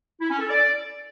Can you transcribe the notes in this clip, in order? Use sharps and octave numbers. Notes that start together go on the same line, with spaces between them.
E4
C#4
A4
D5